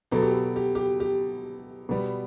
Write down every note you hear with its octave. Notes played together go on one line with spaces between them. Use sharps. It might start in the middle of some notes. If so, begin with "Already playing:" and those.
B2 F#3 B3 A4
G4
A4
G4
G4
G4
B2 G3 B3